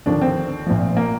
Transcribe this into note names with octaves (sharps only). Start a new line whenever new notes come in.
D#2 D3 F3 D4
C4
A#1 A#2 F3
A#3